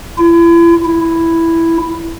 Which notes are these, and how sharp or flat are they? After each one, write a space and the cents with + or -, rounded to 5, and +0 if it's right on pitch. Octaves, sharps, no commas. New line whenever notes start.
E4 +40
E4 +5